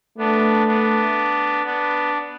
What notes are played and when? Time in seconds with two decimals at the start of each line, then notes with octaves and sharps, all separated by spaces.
0.18 A3 B3 D4
0.67 B3 D4
1.65 B3 D4